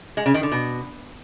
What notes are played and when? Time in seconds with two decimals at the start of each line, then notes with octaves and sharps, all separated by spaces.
0.17 G#3
0.26 C#3
0.34 D#3
0.43 D3
0.52 B2